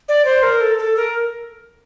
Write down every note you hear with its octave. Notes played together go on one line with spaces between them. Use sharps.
D5
C5
A#4
A4
A4
A#4